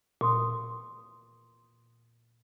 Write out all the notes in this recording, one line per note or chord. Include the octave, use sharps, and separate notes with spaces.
A#2 C6 D#6